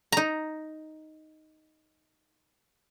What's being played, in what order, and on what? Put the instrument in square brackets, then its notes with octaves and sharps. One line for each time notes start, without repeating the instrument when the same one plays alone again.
[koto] D#4 A#5